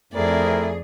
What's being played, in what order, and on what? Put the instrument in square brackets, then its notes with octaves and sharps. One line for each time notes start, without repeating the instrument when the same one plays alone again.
[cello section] F2 G#4 [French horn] A3 [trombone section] C4 E4 A#4 [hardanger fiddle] D5